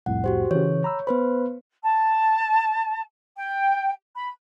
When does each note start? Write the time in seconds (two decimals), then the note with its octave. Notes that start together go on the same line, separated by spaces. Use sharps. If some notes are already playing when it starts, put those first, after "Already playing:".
0.06 C2 F2 A2 F#5
0.24 F#4 G4 C5
0.51 C#3 E3 C#5
0.84 A#5 B5 E6
1.07 B3 B4 C5 B5
1.83 A5
3.36 G5
4.15 B5